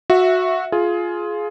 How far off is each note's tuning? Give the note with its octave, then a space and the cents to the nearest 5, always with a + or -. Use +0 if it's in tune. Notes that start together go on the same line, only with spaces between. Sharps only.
F#4 -15 E5 +0
F4 +0 G#4 +15